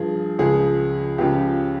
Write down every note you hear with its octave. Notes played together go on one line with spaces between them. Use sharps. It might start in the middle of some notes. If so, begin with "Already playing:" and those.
Already playing: G2 F3 G#4
C#2 C#3 F3 G#4
C#2 C#3 F3 G4